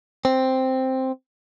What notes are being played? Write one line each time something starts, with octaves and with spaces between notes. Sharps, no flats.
C4